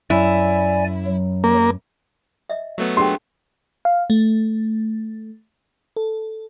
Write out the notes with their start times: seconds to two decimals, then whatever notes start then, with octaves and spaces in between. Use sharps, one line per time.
0.10 F#2 E4 D5 G#5
1.07 F#3
1.44 A#3
2.50 D#5 E5
2.78 F#3 A3 B3
2.97 G4 G#4 G5 C6
3.85 F5
4.10 A3
5.96 A4